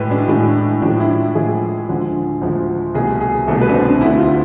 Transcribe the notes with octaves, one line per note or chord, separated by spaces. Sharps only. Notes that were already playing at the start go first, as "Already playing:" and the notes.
Already playing: A2 G#3 B4
D4
A2 G#3 D4
A2 F3 G#3 D4
E4
A2 F3 G#3 G#4
D2 D3 F3 G#3
D2 D3 F3 G#3
C2 B2 A3 G#4
G#4
C2 B2 A3 A4
B4
D4
C4
D4
D2 D3 A3 E4
F4